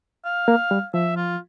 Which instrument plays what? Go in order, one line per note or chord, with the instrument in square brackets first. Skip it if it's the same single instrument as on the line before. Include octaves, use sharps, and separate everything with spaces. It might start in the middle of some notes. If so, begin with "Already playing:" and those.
[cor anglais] F5
[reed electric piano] A#3
G3
[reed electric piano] F3 [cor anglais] E5
[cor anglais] F4